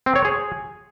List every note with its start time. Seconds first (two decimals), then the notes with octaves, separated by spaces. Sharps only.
0.06 C4
0.16 C#5
0.25 G#4